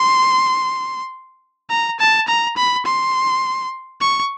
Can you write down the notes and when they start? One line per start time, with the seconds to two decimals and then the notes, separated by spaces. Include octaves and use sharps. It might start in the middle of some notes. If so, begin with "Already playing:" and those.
Already playing: C6
1.70 A#5
1.99 A5
2.27 A#5
2.56 B5
2.85 C6
4.01 C#6